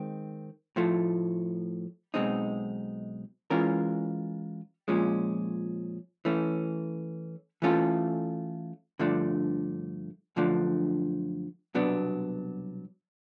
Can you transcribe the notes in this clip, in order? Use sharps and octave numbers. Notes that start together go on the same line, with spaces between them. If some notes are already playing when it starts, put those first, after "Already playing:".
Already playing: D#3 G#3 C4
A2 F3 A3
B1 B2 G#3 C4 D#4
E3 G#3 C#4 F4 A#4
A#2 F3 G#3 C#4
E3 A3 C#4
E3 A3 C#4 F4 A4
G2 D3 F3 A3 D4
F#2 D3 F3 A3 D4
C2 B2 F#3 B3 D4